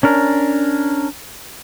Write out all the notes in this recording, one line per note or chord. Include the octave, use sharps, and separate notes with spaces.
C#4 D4 A#4